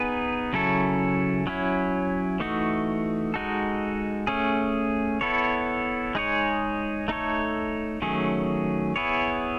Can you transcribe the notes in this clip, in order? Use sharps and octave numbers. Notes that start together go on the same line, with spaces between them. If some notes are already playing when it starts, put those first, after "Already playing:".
Already playing: B3 D#4 G#4 B4
C#3 F#3 C#4 E4 A4
F#3 C#4 E4
E3 A3 D#4 F#4
G#3 D#4 F#4 A4
A3 C#4 G#4
B3 E4 A4 C#5
G#3 D#4 G#4 C#5
A3 D#4 A4 C#5
D#3 F#3 A3 C#4 G#4
B3 E4 G#4 C#5